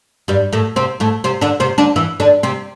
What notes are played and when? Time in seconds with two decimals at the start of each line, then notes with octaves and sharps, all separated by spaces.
0.28 G2 G3
0.53 A2 A3
0.76 C3 C4
1.00 A2 A3
1.24 C3 C4
1.41 D3 D4
1.60 C3 C4
1.78 D3 D4
1.96 E3 E4
2.20 D3 D4
2.43 C3 C4